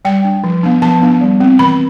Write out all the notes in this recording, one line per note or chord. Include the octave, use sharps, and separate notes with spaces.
G3 G5
D4
F3
B3 D4
F3 A5
B3 D4
G3
C4
E3 B5